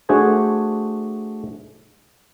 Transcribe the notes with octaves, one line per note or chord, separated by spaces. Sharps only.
A3 D4 F#4 G#4 C5 G#5